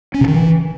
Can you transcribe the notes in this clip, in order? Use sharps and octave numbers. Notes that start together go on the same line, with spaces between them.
C#4
C3
D#3
E3